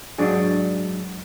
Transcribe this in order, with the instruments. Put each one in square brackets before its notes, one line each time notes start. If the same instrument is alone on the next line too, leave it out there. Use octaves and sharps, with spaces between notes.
[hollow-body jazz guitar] G#2 F#3 D4 G#4